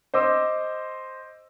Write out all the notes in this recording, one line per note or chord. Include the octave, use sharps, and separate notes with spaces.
C5 D#5 D6 E6